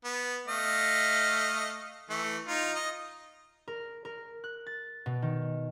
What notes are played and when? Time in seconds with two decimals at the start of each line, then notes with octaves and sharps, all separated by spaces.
0.05 B3
0.48 A3 D#5 F5
2.10 E3 A3
2.48 D#4 F4
2.75 D#5
3.68 A#4
4.05 A#4
4.44 F#6
4.67 A6
5.06 B2
5.22 D#3